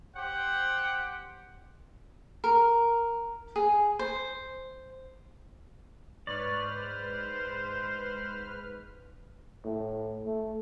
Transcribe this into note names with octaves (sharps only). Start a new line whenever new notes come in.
G4 C5 F#5 G5
A#4
G#4
C5
G#2 B4 C#5 D5 F6
C5
A2
A3